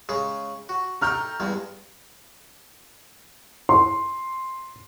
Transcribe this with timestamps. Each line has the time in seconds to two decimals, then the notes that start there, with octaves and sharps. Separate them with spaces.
0.09 C#3 G#3 G#4
0.69 F#4
1.01 A3 D#4 G5 A#5 F6 G6
1.40 E2 G2 G#3
3.69 C6